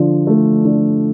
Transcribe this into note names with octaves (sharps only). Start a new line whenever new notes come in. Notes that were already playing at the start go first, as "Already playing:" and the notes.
Already playing: D3 F3
A3
D3